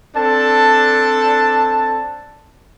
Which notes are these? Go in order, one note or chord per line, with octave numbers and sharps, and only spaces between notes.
C4 D4 A4 A5